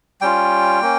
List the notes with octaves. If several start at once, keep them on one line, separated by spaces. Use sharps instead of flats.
G3 C#4 F4 G5
A#3 C#4